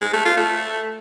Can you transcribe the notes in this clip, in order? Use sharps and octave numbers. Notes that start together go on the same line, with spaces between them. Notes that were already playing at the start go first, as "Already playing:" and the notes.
G#3
A3
F4
A3